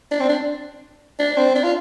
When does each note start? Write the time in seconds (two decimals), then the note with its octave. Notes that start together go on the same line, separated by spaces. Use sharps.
0.12 D4
0.20 C4
0.29 D4
1.19 D4
1.37 C4
1.55 D4
1.64 F4